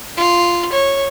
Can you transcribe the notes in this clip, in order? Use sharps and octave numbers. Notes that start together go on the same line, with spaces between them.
F4
C#5